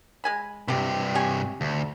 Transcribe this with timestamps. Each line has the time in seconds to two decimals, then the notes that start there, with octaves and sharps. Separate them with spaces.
0.24 G#3 G#5 B5
0.68 G2 C3 G4 C5
1.15 G4 C#5 G#5
1.61 D2